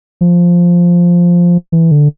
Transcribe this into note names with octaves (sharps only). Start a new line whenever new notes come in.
F3
E3
D3